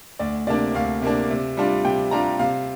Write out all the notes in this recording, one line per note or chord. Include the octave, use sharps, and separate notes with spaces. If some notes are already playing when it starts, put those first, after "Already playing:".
D2 D5
C3 A#3 D4 D5
D2 F5
C3 A#3 D4
C3
G3 D4 F4
C3 G5
G3 D4 F4 A#5
C3 F5